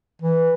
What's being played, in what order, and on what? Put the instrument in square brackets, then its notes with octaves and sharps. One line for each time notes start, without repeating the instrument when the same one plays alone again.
[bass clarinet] E3